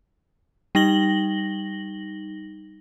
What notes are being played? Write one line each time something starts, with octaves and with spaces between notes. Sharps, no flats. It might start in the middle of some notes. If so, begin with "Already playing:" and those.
G3 D#4 A#6 F#7 G7